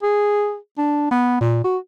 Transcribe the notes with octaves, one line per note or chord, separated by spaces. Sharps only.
G#4
D4
B3
A#2
F#4